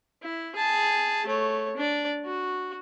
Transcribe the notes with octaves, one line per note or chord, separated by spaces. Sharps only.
E4
G#4 A5
A3 C#5
D4 D5
F#4